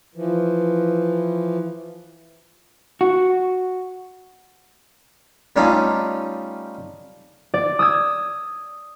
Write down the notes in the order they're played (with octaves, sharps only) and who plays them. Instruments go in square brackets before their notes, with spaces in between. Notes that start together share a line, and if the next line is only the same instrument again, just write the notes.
[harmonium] E3 F3
[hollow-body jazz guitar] F#4
[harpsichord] G3 A3 C#4 D#4 F4
[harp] D5
D#6 E6 G#6